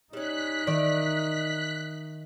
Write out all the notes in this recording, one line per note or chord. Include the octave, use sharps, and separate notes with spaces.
G3 C#4 D#4 F#6 B6
D#3 D5 E5